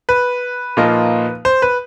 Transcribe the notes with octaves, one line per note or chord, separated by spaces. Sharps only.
B4
A#2 F3 A#3 D#4
C5
B4